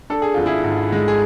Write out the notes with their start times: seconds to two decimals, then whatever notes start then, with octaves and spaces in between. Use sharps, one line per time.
0.10 D4 A4
0.22 G#4
0.34 G#1 F4
0.46 E4 G#4
0.64 G#2
0.92 G#3
1.08 G#4